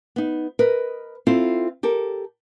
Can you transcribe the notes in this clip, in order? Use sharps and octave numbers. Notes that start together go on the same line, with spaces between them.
B3 D#4
A#4 B4 D#5
C4 E4 F4 A4 C5
G4 A4 A#4